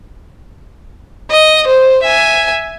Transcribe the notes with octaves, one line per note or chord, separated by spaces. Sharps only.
D#5
C5
E5 G#5